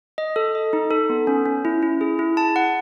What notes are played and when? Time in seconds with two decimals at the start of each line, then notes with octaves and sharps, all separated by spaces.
0.18 D#5
0.36 A4
0.55 D#5
0.73 D#4
0.91 A4
1.10 B3
1.27 C#4
1.46 C#4
1.65 E4
1.82 E4
2.01 G#4
2.19 E4
2.37 A5
2.56 F#5